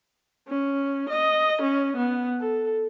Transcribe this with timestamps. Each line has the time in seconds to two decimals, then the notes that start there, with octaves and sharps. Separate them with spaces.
0.48 C#4
1.09 D#5
1.62 C#4
1.96 B3
2.40 A4